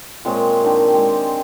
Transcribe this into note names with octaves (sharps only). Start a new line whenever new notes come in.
A#2 G#3 C4 C#5
D#3 D4 G4
G#3 G4